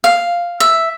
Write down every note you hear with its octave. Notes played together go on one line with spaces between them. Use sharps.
F5
E5